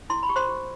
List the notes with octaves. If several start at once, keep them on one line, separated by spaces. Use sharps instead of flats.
E4 C6
B5
G4
C5 C6
G4